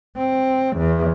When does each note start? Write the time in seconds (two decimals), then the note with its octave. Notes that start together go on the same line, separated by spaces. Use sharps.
0.18 C4
0.78 E2